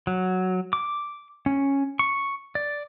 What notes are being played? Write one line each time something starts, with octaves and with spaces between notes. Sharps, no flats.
F#3
D6
C#4
C#6
D5